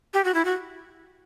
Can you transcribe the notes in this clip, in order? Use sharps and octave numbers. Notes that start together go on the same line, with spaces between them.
G4
F#4
E4
F#4